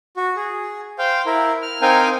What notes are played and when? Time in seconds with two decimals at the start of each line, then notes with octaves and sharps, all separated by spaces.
0.17 F#4
0.36 G#4
0.98 C5 F5 G5
1.26 E4 A#4
1.62 F6
1.82 C4 D#4 A#4 F5 G5 G#5